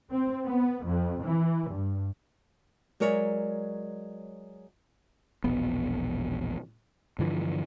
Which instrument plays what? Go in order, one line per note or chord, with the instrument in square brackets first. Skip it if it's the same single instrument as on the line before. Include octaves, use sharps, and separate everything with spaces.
[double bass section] C4
B3
F2
E3
G2
[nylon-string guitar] F#3 G#3 A#4 C#5 D5 E5
[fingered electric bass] E1 A#1 B3
G2 D3 E3 F3